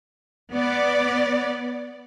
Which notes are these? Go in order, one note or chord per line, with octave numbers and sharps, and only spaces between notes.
B3 D5